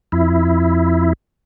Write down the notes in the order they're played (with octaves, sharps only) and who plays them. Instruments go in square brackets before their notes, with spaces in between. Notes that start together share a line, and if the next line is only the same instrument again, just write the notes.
[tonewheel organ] F2 E4